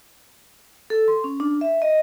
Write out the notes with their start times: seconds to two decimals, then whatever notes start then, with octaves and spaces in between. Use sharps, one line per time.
0.90 A4
1.08 C6
1.24 C#4
1.40 D4
1.61 E5
1.82 D#5